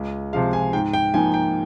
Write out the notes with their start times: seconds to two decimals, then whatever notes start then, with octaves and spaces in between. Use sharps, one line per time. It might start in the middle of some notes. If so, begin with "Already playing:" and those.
Already playing: C#2
0.33 C3 F3 G#3 F5
0.53 G#5
0.73 G#2 G5
0.93 G5
1.14 F3 A#3 D#4 G#5
1.34 G5